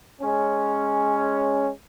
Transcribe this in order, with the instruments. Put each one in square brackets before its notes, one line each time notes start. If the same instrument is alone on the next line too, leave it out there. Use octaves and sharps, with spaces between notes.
[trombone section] G#3 C#4